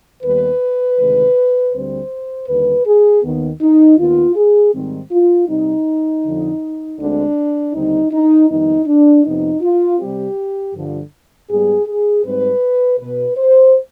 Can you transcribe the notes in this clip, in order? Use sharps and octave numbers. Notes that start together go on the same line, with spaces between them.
D#2 D#3 G3 B3 B4
D2 C3 D#3 G#3
D2 D3 G3 C4 C5
D#2 D3 G3 B4
G#4
D#2 D#3 B3
D#4
D#2 D#3 B3 F4
G#4
G#2 D#3 G3 C4
F4
C3 G3 C4 D#4
F2 D3 F3
D2 D3 G#3 C4 D4
D#2 D3 G3 C4 D#4
D#4
F2 D#3 G3 B3 D#4
D4
F2 C3 F3 B3 D#4
F4
C3 G3 C4 G4
G2 D3 F3
G#2 G3 B3 G#4
G#4
G#2 G3 C4 B4
B2 B3 B4
C5